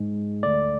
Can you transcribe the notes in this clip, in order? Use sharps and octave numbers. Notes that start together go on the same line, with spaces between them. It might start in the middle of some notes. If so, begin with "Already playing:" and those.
Already playing: G#2 G#3
D2 D3 A3 D5